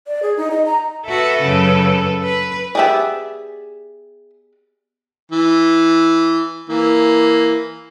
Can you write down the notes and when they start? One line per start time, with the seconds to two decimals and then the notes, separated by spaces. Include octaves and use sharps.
0.07 D5
0.23 G#4
0.37 D#4
0.51 D#5
0.66 A#5
1.06 F#4 A4 B4 E5
1.41 F#2 C#3
2.24 B4
2.75 B3 G4 G#4 D5 E5
5.32 E3
6.70 E3 A#3